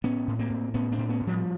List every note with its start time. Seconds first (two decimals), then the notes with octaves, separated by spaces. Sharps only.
0.04 A2 B3 C#4
0.28 A2
0.39 A#3 C4
0.50 A2
0.74 A2 B3 C#4
0.92 C4 D4
0.98 A2
1.09 B3 C#4
1.21 A2
1.27 F3 G3